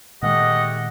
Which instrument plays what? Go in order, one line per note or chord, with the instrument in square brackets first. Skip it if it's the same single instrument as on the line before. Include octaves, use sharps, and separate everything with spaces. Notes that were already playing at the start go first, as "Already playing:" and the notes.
[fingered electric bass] A#2 D#3 G#3 [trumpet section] A3 G4 F#5 [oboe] D#5